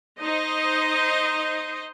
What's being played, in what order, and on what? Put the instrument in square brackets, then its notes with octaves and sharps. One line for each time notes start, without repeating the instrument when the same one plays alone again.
[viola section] D#4 C5 D#5